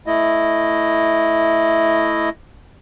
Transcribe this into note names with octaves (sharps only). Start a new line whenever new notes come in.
A3 E4 D#5